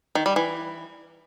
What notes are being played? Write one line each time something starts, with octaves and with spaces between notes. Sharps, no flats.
D#3
G3
E3